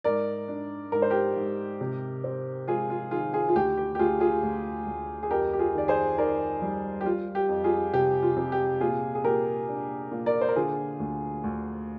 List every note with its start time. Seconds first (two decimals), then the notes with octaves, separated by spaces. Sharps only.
0.04 G#2 A#4 D5
0.48 D4
0.92 G#2 A#4
1.02 C5
1.10 G4 A#4
1.36 G#2
1.81 C3
2.24 C4
2.68 G#3 F4 G#4
2.90 F4
3.11 D#3 F4 G#4
3.33 F4 G#4
3.49 F4
3.55 D2 G4
3.77 G4
3.95 G4
3.99 D2 F4 G#4
4.20 F4 G#4
4.43 D2
4.87 D2
5.23 G#4
5.30 F2 G4 A#4
5.53 G4
5.59 F4 G#4
5.74 D#3 D5
5.88 G#4 C5
6.18 D#3 A#4 D5
6.62 G3
7.01 G4
7.05 G3 F4
7.35 G4
7.49 F2
7.64 F4 G#4
7.93 C3 G4
8.23 F4
8.37 C3
8.52 G4
8.81 A#2 F4 G#4
9.15 G#4
9.24 A#2 G4 A#4
9.69 D4
10.12 A#2
10.26 A#4 D5
10.41 C5
10.49 A#4
10.56 D3 F4 G#4
11.00 D2
11.44 D2